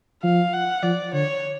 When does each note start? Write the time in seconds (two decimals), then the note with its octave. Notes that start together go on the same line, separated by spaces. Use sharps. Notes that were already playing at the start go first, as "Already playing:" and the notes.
0.23 F3 F5
0.53 F#5
0.83 F3 D5
1.13 D3 C#5